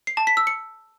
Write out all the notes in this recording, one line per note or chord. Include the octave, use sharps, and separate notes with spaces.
C7
A5
B6
E6
C#7